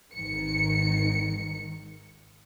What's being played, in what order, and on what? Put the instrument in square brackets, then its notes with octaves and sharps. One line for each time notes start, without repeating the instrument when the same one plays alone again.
[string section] G#1 D#3 C#7